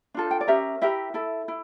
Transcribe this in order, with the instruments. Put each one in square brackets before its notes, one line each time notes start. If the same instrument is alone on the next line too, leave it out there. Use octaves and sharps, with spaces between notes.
[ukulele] D4 F4 A4
G5
D5
C#4 G4 A#4 E5
E4 G4 A#4 E5
E4 A4
E4